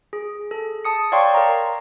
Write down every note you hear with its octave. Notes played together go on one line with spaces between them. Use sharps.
G#4
A4
A5 D#6 C#7
C#5 D5 F5 G5 C6 C#6
A#4 A#5